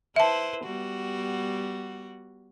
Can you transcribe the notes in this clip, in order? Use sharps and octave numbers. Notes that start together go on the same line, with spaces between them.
E4 B4 C5 E5 A5
G3 B3 F#4